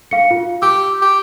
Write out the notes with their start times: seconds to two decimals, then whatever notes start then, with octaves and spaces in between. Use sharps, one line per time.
0.11 F5 C#7
0.31 F4
0.62 G4 E6
1.02 G4